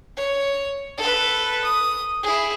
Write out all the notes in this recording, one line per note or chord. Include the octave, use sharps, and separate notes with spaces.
C#5
A4 B4
D#6
E4 G#4